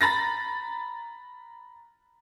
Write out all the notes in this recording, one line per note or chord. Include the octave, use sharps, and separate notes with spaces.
A#5 B5 A6 A#6